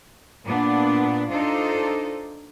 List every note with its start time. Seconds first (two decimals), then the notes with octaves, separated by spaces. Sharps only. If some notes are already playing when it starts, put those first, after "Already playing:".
0.45 A#2 B3 D4
1.30 D4 D#4 F4 A4 C5